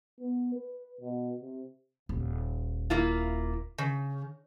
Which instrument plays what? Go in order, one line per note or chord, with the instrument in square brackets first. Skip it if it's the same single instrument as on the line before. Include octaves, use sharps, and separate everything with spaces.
[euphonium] B3
B4
B2
C3
[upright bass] D#1
[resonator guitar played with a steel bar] A#3 E4 F4
C#3